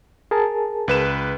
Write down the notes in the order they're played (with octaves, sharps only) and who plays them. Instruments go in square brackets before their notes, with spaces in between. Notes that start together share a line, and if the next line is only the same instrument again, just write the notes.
[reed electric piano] G#4 A#4 A5
[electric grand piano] C#2 B4 E7